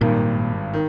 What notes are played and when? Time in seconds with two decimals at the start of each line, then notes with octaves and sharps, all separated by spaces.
0.01 G#1 G2 A#2 D#3
0.73 D#3